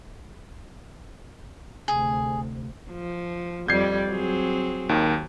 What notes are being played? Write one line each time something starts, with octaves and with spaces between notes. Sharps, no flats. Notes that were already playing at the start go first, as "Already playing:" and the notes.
D2 C3 G#4
F3
F2 G3 D5 G6 G#6 C7
F#3 C4 G#4
D#2 D#3